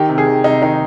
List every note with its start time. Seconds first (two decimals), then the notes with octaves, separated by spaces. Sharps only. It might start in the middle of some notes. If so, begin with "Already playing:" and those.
Already playing: D#3 G4
0.09 C3
0.18 G#4
0.26 D#3
0.44 C3 D#4
0.62 D#3 D#4